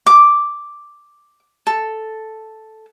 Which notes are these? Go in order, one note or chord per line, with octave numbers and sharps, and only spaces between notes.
D6
A4